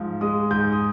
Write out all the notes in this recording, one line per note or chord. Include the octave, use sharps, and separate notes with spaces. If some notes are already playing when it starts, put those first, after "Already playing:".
Already playing: G#2 F3
G#3 D#6
G#2 G6
D#6